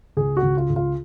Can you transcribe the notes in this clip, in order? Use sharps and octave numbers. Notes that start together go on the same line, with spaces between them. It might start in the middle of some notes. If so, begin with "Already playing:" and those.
C#2 G#4
F#4
C#2
F4
C#2
F4